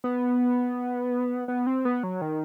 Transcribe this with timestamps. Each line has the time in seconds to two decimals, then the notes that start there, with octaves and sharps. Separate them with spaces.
0.04 B3
1.48 B3
1.67 C4
1.85 B3
2.03 F#3
2.21 D#3